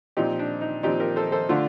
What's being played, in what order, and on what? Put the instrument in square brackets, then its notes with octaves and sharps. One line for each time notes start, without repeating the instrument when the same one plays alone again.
[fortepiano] A#2 F3 C4 D#4 G4
D4
D#4
A#2 F3 C4 D#4 G4
G4 A#4
A4 C5
A4 C5
D3 A3 D4 F4